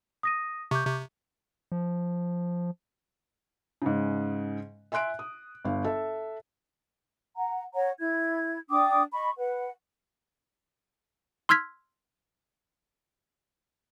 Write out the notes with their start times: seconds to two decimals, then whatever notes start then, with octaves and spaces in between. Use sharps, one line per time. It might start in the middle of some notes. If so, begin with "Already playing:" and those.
0.23 D#6 A#6 D#7
0.71 C3 C#6 D6 G6
0.85 C3
1.72 F3
3.82 G#2 C#3
4.92 E5 G#5 C6 F#6 D7
5.19 D#6
5.65 G1 F5
5.84 A4 E5
7.36 F#5 A#5
7.75 C#5 F#5 A#5
8.00 E4 G#6
8.70 D4 G5 D6 D#6
9.12 D#5 B5 C#6
9.37 B4 F#5
11.49 C6 E6 F6 G#6 B6